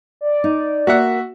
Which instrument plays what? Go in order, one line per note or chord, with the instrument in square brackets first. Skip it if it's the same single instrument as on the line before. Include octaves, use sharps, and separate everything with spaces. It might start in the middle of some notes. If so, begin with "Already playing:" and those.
[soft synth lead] D5
[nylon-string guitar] D#4
[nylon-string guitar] A#3 [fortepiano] F#4 E5 F#5